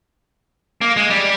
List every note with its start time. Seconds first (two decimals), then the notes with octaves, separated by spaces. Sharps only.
0.81 A#3
0.96 G#3
1.10 G3